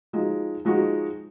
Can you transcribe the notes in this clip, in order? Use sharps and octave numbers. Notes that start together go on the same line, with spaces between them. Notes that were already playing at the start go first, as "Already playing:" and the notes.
F3 G#3 D#4 F#4
F3 G#3 D#4 F#4